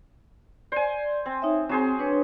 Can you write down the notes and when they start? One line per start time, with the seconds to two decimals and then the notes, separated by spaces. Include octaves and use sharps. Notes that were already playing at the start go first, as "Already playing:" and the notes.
0.72 C5 D5 G#5
1.26 C4
1.42 D#4 C#5 E5
1.69 F#3 C4 G#4 C5
1.99 D4 B4 C#5